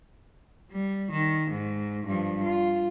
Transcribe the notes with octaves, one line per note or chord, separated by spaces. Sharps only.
G3
D#3
G#2
G2 F3
F4